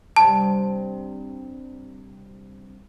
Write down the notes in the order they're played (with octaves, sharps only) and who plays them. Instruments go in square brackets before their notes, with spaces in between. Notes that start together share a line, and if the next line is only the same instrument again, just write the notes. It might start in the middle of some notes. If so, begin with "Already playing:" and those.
[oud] G2 C3 G3 [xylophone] A5